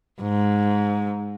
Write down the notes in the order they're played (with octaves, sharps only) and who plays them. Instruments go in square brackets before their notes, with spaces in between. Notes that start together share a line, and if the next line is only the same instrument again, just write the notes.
[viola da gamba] G#2